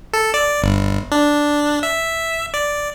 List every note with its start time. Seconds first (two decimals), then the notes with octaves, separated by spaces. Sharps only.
0.13 A4
0.34 D5
0.62 G1
1.12 D4
1.83 E5
2.54 D5